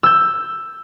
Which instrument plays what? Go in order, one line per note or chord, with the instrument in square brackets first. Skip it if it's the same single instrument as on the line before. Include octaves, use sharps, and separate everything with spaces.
[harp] E6 G6